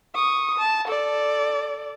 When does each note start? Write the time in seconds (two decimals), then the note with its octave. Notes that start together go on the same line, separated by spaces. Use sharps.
0.15 C#6 D#6
0.58 A5
0.88 A4 D5